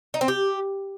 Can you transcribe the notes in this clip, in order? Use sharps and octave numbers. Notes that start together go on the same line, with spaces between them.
D#4
C4
G4